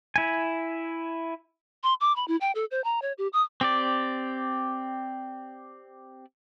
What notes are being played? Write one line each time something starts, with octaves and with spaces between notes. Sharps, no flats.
E4 G#5
C6
D6
B5
E4
G5
A4
C5
A#5
C#5
G4
D#6
C4 G4 D5